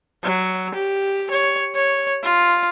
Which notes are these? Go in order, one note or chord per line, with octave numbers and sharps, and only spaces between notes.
F#3
G4
C#5
C#5
F4